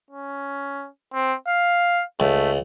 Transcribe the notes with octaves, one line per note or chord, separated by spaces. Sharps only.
C#4
C4
F5
C#2 A3